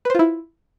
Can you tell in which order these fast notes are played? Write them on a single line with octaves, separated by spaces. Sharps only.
B4 C5 F4 E4